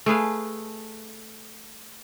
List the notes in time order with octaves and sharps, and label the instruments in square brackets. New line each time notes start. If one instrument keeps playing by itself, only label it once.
[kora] A3 G#4 B4 F5